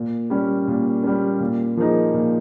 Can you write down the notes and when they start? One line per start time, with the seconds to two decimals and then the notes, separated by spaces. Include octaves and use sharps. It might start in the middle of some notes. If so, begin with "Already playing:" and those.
Already playing: A#2
0.30 G3 C#4
0.68 A#2
1.03 G3 C#4
1.40 A#2
1.77 F3 A#3 D#4 G#4
2.14 A#2